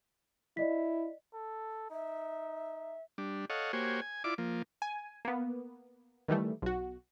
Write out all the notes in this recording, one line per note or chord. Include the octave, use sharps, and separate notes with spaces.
E4 D5 D#5 B6
A4
D#4 E5
G3 D4
A4 C#5 D#5 F5 F#5
A#3 F#4 G4 C5 C#5 G#5
G#5
E4 F4 D5 D6
F3 A#3
G#5
A#3 B3
D#3 E3 G3 A3
B1 F#4